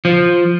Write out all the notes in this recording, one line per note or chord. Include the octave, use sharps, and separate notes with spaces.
F3